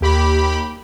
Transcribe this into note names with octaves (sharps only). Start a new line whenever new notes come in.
D#2 G4 B5